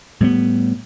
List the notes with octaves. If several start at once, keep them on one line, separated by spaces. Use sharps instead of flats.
A2 G3 G#3 B3